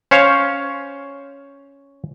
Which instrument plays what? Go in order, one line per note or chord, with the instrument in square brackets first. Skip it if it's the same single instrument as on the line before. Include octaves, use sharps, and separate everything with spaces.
[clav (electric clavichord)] C#4 C5 C#5 F5